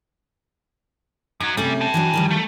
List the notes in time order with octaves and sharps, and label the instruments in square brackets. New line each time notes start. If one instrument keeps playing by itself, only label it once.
[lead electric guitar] F#2 F#3 [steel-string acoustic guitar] D#4
[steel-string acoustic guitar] C3 A3 C#4 [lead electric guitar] G3
[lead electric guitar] G5 A5
[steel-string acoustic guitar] E3 F#3 D4
D#3 F3 G3
[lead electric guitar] A3